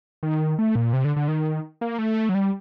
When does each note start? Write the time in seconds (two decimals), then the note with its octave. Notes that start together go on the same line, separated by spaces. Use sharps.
0.23 D#3
0.59 A3
0.76 A#2
0.93 C3
1.05 D3
1.16 D3
1.28 D#3
1.81 A#3
1.99 A3
2.29 F#3
2.35 G3